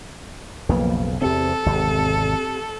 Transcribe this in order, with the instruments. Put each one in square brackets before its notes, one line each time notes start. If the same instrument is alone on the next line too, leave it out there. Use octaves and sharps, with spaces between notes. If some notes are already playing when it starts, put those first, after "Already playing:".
[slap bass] B1 F2 C#3 [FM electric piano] F3 A#3 B4
[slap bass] E2 C3 [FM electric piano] C4 G4 [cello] A4
[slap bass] G#1 E2 C3